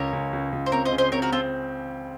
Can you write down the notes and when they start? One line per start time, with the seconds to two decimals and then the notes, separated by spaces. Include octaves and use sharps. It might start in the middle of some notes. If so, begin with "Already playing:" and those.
Already playing: C#2 A#4 C#5
0.13 C#2
0.33 C#2
0.52 C#2
0.66 C5
0.72 C4 A#4 C#5
0.85 C5 D#5
0.92 C#3
0.98 C5 D#5
1.12 C4 A#4 C#5
1.22 F#4 A#4
1.32 C4 F4 A4